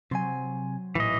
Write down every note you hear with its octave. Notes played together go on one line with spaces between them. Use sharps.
C3 F#3 C4 G#5 C6
A1 A#2 E3 D#5